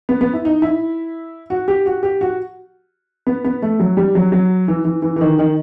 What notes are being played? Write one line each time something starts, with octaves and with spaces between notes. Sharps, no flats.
B3
B3
E4
D#4
E4
F#4
G4
F#4
G4
F#4
B3
B3
A3
F#3
G3
F#3
F#3
E3
E3
E3
E3
D#3
D#3